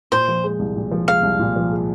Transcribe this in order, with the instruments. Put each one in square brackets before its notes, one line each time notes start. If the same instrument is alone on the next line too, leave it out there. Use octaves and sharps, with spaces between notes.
[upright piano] A#2 [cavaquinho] C5
[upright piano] F3
G#3
C2
A#2
F3
[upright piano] G#3 [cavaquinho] F5
[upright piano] C2
A#2
F3
G#3